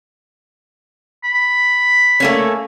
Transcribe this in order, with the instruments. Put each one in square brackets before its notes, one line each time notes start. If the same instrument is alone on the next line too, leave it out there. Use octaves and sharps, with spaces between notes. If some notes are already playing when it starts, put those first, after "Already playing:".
[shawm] B5
[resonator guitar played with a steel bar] A3 A#3 C#4